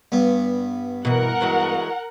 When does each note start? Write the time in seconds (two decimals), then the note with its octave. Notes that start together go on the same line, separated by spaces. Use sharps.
0.12 G2 B3
1.05 B2 E3 A#4 F#5
1.41 E3 F#3 G#3